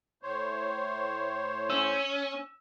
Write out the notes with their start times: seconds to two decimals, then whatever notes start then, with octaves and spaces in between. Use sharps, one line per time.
0.23 A2 C5 C#5
1.70 C#4 E6